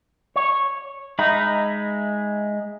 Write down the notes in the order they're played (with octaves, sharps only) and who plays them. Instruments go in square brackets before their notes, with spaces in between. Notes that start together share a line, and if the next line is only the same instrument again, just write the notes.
[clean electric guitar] C#5
[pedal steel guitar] G#3 E5 B5 [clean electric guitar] D#4